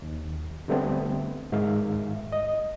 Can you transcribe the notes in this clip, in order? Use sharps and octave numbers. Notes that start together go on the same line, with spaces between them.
D#2
D3 G3 A3 B3 C4
G#2 D#3 G#3 E5 F5
D#5